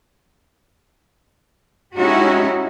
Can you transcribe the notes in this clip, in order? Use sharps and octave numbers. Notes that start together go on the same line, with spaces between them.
G#3 C#4 D#4 E4 F#4 G4